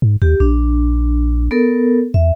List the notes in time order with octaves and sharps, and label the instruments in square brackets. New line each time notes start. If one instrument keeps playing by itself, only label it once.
[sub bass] G#2
[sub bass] D#2 [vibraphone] G4
[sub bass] A#1 [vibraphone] D4
[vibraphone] B3 A4 A#4
[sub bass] E2 [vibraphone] E5